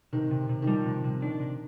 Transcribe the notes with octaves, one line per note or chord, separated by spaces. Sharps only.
C3 D#3
C3
C3
D#3
F3 G3
C3
C3
D#3 D4
C3